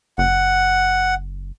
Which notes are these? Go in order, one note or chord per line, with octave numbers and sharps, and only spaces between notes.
F#1 F#5